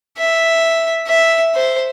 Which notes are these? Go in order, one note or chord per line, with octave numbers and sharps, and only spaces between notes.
E5
E5
C5